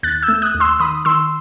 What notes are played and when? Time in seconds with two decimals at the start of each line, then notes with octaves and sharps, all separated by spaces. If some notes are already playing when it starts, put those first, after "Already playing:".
0.03 D#2 F#6 A6
0.23 E6 G6
0.28 A3
0.42 D#6 F#6
0.55 D#2
0.60 C6 E6
0.80 D#3 B5 D#6
1.05 D#3 C6 E6